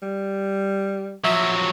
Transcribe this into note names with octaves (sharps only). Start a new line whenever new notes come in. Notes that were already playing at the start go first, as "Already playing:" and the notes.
G3
F3 F#3 E5